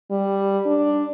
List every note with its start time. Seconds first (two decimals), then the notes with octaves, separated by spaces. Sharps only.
0.11 G3
0.65 D4